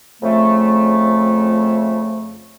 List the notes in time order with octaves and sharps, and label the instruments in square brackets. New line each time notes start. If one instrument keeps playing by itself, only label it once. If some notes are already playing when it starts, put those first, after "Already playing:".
[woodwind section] F2 C#3 A3